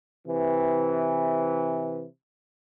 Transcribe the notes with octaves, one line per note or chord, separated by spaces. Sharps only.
C3 E3